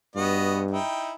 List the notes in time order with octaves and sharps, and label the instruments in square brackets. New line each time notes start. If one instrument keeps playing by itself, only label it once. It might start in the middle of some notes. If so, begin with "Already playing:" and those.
[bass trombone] G2 [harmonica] B3 F#4 D#5
[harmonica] D#4 E4 G5